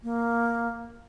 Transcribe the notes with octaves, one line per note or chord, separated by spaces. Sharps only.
A#3